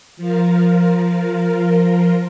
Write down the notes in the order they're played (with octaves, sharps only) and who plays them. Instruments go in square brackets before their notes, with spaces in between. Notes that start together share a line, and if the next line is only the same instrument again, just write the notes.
[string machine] F3 F4 A#4